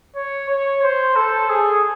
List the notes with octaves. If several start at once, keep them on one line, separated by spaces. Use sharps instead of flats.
C#5
C#5
C5
A4
G#4